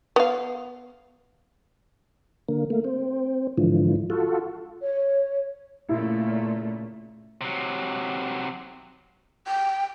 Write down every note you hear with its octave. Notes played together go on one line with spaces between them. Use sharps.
B3 F5
D3 A#3
A3 A#3
C4
G#2 D3 E3 F3
F4 F#4 A4
C#5
A#2 C#3 A3 E4
C3 F#3
G5